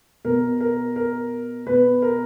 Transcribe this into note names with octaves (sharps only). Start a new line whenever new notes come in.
B2 A#4
A#4
A#4
B2 B4
A#4